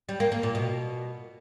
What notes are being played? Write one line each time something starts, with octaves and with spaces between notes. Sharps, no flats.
G3
A#3
A#3
A#2
B2